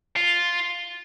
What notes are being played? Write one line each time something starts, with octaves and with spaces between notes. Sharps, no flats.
F4